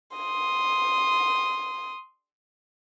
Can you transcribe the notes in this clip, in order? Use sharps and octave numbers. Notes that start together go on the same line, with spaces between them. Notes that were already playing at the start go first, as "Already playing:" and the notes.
C6 D#6